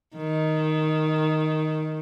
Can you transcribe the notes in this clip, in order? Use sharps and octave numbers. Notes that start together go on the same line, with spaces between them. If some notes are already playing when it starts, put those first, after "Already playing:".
D#3